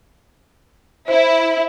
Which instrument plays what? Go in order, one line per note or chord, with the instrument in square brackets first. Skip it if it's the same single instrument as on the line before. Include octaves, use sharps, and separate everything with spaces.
[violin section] E4 [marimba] C5